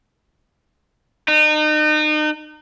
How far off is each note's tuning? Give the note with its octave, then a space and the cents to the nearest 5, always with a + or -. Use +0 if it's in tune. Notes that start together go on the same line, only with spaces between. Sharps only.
D#4 -35